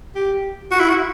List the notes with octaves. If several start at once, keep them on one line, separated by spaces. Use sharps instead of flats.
G4
F#4
E4
F#4